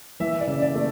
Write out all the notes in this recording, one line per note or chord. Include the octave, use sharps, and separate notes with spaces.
E3 E5
D5
C#3
D5
A3